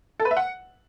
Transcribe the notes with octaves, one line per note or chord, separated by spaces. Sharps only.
A4
B4
E5
F#5